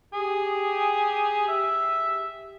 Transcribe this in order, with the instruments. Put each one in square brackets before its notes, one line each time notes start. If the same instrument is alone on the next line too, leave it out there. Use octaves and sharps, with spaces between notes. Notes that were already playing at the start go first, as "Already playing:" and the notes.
[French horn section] G4 [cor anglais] G#4
[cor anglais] E5